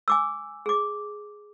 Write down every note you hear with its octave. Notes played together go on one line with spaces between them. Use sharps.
G#5 D6 E6
G#4 D6